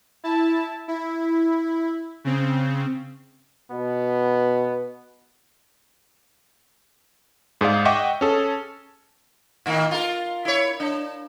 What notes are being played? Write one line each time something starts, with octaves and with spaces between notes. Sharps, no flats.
E4 A5
E4
C#3 C4
B2 B3
G#2 G#4 D5 F5
D#5 E5 F#5 G5 C#6 D6
C#4 G#4 A4
A2 D#3 A#3
F4 A#4
E4 C#5
D4